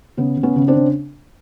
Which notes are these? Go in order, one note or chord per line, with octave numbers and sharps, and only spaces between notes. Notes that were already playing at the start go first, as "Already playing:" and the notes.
C#3 B3
C#3
B3 C#4
C#3
C4 D4
C#3